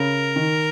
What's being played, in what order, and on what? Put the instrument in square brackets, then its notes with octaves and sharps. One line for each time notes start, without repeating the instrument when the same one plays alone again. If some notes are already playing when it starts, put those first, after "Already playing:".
Already playing: [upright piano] C#3 [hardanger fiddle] A#4
[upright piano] D#3